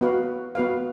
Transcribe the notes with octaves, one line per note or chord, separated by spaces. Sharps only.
B3 F#4 B4 F5
B3 F#4 B4 F5